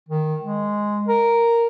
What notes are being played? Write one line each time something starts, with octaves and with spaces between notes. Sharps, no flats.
D#3
G#3
A#4